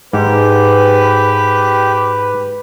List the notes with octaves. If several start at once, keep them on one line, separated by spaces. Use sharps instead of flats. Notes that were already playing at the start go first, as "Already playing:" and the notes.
G#2 G4 B4